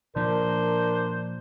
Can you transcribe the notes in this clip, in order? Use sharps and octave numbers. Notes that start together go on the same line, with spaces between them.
A#2 F3 D4 A#4 C5